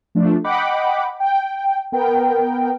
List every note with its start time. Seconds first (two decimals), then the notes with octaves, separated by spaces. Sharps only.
0.15 F3 A3 D4
0.44 D#5 F#5 G5 B5 D6
1.20 G5
1.92 B3 A#4 G5